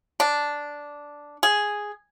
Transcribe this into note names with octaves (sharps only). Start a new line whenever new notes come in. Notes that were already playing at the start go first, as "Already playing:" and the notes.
D4
G#4